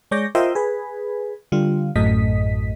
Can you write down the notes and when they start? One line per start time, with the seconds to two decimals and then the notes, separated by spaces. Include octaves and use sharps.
0.11 G#3 C#5 D5 G6 A#6
0.35 F4 A#4 C5 D#5 E5 G5
0.55 G#4 B4
1.52 D3 G3 F4
1.96 A1 F#2 A2 A3 D#5 B6